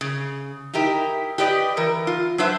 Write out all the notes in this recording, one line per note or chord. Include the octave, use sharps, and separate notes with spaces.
C#3
D#4 E4 G4 A#4
G4 B4 D5 D#5
E3 A#4
F4
F#3 D4 B4 C5 E5